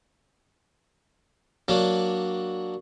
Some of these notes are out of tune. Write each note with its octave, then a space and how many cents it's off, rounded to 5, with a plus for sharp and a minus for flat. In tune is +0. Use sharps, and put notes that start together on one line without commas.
F#3 +0 A#3 +0 D4 +5